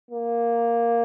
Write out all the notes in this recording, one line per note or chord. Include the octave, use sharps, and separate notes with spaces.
A#3